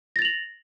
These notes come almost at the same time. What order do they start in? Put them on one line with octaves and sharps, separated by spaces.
A#6 A6 F7 F#7